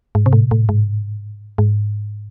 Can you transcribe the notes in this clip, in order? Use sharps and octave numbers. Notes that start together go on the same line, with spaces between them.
G#2
C3
A2
A2
G#2
G#2